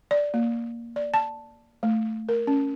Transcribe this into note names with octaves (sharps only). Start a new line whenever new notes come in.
D5
A#3
D5
A5
A3
A#4
C#4